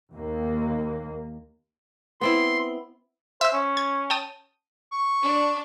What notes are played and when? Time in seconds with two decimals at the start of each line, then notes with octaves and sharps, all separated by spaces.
0.15 D#2 A#3
2.21 B3 C4 E4 C6
3.41 C5 E5 E6
3.53 C#4
3.77 G#6
4.10 G5 A5 D#6
4.92 C#6
5.22 D4